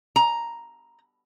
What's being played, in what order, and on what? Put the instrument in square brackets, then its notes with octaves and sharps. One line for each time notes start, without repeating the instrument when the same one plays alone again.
[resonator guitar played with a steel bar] A#5